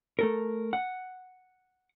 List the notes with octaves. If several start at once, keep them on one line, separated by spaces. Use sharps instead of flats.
A3 A4 A#4
F#5